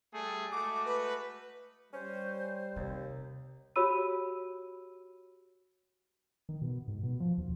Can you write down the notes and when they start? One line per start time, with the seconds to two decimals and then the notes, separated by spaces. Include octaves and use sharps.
0.14 G3 A3 G#4
0.52 G#3 A3 F#4 D6
0.86 B4
1.93 G3 C#4 C5
2.76 D#2 C3
3.76 F#4 G4 C#5 B5 E6 D#7
6.49 D#3
6.62 B2
6.88 G#2
7.03 B2
7.20 F3
7.38 D#2